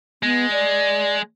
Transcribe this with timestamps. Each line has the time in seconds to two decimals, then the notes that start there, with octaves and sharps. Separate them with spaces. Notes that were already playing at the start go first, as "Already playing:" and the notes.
0.23 G#3 B3
0.52 D5